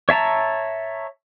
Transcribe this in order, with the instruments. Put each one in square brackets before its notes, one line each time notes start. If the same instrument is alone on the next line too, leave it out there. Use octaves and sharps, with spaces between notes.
[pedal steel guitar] C#5 E5 A5 A#5